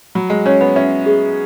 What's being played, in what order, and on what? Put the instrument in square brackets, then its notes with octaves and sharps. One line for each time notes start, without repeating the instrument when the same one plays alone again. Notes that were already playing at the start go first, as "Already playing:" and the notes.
[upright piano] F#3 [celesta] B5
[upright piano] G#3
[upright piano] C#4 [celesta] C#5
[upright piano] B3
[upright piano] C#4 [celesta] E5
[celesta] G#4